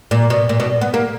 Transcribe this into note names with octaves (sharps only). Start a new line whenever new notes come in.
A#2
B2
A#2
B2
B3
A#3